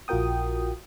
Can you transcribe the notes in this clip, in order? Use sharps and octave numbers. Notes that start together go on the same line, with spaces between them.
A#1 F4 F#4 A#4 G5 D#6